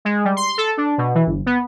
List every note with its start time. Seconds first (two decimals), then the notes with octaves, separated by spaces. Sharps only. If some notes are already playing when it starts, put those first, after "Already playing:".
0.05 G#3
0.25 G3
0.37 C6
0.58 A4
0.77 D4
0.98 B2
1.15 E3
1.26 G1
1.46 B3